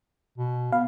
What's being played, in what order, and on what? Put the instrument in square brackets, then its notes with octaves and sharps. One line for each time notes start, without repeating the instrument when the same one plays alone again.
[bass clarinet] B2
[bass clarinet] B3 [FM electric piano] F5